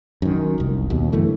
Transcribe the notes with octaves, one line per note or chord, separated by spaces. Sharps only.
F#2 D#3
F1 C2
D#2 B2
F#2 D3 E3 A3